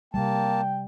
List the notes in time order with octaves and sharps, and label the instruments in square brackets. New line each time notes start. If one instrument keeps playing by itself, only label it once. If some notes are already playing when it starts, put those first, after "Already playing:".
[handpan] C3 G3 [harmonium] A#3 A5 [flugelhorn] G5